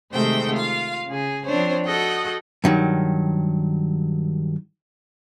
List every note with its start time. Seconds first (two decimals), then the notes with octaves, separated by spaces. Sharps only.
0.13 C3 D#3 G#3 A3 C5 G5
0.55 F4 F5
1.08 C#3 G#4
1.46 F3 C4 D4 C5 C#5
1.86 F#4 A4 D#5 F#5 G5
2.64 G2 D#3 F#3